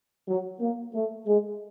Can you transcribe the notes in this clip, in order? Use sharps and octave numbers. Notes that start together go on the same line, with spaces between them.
F#3
A#3
A3
G#3